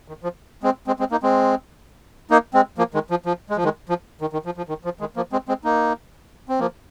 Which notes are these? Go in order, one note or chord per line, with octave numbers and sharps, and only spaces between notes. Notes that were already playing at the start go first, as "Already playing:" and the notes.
D#3
F3
G#3 C4
G#3 C4
G#3 C4
A#3 D#4
G#3 C4
A#3 D#4
G#3 C4
F3 A#3
D#3 G#3
F3
F3
G#3
F3
D#3 G#3
F3
D#3
D#3
F3
F3
D#3
F3
D#3 G#3
F3 A#3
G#3 C4
G#3 C4
A#3 D#4
C4
F3 A#3